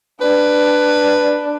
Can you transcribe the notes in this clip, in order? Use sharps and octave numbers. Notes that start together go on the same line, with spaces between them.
D4 B4